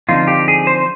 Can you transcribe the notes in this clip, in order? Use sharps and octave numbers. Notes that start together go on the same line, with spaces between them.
D3 F3 C4 D#4 F4
G4
G#4
C5